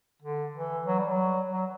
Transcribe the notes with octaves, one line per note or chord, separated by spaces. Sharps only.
D3
E3
F#3
G3
F#3
F#3